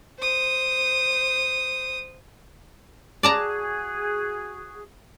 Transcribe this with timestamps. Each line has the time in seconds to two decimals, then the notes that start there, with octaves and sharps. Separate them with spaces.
0.19 C5 D#6
3.23 F#4 G#4 D5 A5 A#5